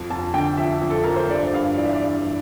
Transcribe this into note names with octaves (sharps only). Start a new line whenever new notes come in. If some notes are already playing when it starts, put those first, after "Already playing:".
Already playing: F2
F2 A5
D3 G5
F3 E5
F2
A4
F3 A#4
C5
G2 D5
G2 F5
E3 D5
E5
D5
G2
E3